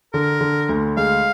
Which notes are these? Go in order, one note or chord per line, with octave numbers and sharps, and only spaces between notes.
D3 A#4
D3
D2
G#3 F5